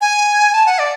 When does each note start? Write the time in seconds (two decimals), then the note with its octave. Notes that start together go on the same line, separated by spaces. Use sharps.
0.01 G#5
0.53 A5
0.66 F#5
0.79 D5